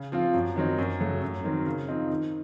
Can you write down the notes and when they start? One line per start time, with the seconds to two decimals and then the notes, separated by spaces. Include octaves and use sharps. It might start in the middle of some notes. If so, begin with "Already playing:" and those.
Already playing: C#3
0.12 F3 C4 F4
0.34 F#2
0.56 D#3 F#3 C4 D#4
0.78 F#2
1.00 C#3 F#3 A3
1.22 F#2
1.44 D#3 F#3 C4
1.66 C#3
1.88 F3 C4 D#4
2.10 D#3